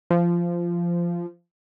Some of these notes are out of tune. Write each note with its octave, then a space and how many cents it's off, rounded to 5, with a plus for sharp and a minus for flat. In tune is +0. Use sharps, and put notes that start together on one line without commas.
F3 -15